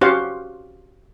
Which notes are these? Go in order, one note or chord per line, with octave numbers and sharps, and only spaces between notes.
C#4 F#4 G4 C5 F5 F#5